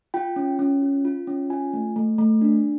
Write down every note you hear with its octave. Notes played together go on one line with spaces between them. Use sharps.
F4 G5
C#4
C#4
F4
F4
C#4
F4 G#5
A3
A3
A3
D4